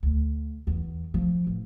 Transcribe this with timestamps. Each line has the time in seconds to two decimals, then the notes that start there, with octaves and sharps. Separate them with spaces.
0.03 D2
0.67 E2
1.14 F3
1.47 A1